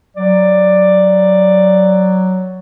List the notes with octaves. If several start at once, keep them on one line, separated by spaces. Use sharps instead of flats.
F#3 D5